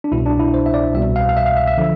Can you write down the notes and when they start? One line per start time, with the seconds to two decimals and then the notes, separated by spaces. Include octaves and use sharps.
0.04 D4
0.12 C2 B2 E4
0.26 D4
0.39 E4
0.54 C5
0.66 E5
0.74 D5
0.94 C2 B2 E5
1.16 F5
1.29 F5
1.37 E5
1.46 F5
1.57 E5
1.68 E5
1.78 D3 F3